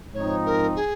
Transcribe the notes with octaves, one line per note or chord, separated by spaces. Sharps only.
G#2 F3 C4 D#4 C#5
A#4
G#4